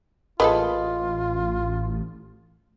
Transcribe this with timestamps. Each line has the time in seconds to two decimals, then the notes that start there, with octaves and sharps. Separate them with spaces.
0.40 A1 A#3 F4 G#4 A4 B4 D#5